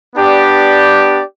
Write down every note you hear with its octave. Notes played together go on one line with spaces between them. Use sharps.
B3 D4 G4 D5